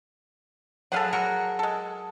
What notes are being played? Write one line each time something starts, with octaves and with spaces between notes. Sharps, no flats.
F#3 G#4 A4 B4 F5 F#5
F#4 A#4
G#3 A4